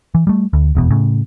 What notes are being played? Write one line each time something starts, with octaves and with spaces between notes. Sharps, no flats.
E3
G3 A3
D2
F1 E2 B2
A2 C#3